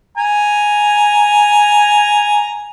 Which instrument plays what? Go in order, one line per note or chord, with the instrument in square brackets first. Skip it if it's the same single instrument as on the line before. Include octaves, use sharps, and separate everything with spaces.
[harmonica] G#5 A#5